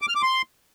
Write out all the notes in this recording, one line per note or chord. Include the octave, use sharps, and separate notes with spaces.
D6
F6
D6
C6